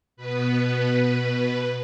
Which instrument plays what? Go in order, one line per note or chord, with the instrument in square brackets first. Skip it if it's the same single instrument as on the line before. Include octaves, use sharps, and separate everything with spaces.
[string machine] B2 B3 B4